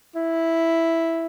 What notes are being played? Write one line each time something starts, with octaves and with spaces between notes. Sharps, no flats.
E4